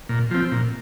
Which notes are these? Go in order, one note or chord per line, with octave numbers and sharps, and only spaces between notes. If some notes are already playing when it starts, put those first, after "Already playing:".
A#2
F3 C4
A#2